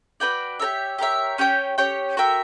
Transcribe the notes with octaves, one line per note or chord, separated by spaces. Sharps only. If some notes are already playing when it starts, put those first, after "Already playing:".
F#4 B4 D5 G5
G4 A#4 C#5 E5
G4 A#4 C#5 E5
C#4 G4 C#5 G5
C#4 G4 C#5 G5
F#4 A#4 E5 G5